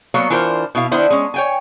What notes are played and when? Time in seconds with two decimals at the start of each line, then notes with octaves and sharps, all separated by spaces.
0.14 F#3 A#3 B3 C#5 F5
0.30 E3 D4 F4 A#4 C5
0.75 B2 E4 F5
0.91 D#3 B3 D4 E4 C5
1.10 G#3 C#4
1.34 C#5 G5 G#5